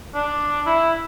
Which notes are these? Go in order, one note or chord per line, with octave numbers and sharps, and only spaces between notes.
D4
E4